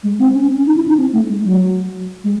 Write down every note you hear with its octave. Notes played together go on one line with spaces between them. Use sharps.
G#3
C4
C#4
C#4
D#4
E4
D#4
C4
A3
G#3
F#3
G#3